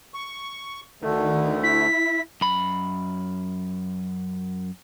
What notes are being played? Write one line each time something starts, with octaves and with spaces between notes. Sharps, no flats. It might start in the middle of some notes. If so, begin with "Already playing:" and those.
C#6
D2 D3 D#3 A3
E4 B6
F#2 B5